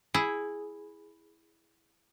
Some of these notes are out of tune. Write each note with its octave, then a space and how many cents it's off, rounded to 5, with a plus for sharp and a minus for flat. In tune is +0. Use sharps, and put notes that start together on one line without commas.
E4 +0 G#4 +0